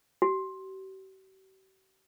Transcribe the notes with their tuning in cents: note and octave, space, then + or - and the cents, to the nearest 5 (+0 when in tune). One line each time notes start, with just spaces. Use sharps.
G4 -45